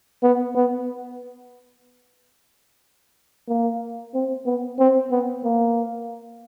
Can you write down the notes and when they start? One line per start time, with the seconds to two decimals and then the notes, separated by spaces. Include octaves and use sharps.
0.23 B3
0.56 B3
3.48 A#3
4.15 C4
4.46 B3
4.79 C4
5.11 B3
5.44 A#3